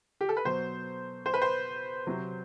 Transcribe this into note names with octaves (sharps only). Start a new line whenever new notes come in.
G4
A4
B4
B2 F#3 C5
C5
B4
C5
C3 F#3